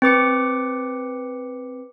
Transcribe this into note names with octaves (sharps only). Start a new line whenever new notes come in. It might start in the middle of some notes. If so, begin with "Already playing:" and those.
C4 B4 D6 C#7